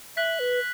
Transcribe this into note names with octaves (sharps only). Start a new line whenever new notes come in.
E5 F#6 B6 F#7
B4